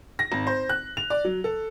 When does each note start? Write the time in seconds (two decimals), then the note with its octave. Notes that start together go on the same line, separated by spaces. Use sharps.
0.19 A#6
0.32 G#1
0.47 C5
0.69 F#6
0.97 F7
1.10 D5
1.25 F#3
1.44 A4